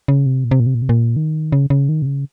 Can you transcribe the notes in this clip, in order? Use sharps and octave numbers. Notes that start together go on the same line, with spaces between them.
C#3
C3
A#2
C3
A#2
C3
A#2
C3
A#2
D#3
C#3
C#3
D#3
C3
C#3